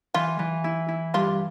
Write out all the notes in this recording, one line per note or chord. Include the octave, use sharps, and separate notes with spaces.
E3 F4
E3
E4
E4
G2 F4